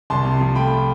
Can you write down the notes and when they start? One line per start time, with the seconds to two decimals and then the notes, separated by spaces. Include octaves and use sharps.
0.10 C2 A5 C6
0.26 C3
0.41 F3
0.55 A3 G5 B5